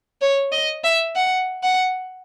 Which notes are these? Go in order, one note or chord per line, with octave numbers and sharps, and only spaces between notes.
C#5
D#5
E5
F#5
F#5